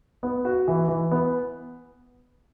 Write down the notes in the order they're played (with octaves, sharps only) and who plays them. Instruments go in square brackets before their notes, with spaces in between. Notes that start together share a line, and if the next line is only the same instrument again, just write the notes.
[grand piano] B3
F#4
E3
E3
B3